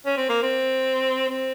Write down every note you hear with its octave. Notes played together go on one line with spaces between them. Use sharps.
C#4
C4
A#3
C4
C4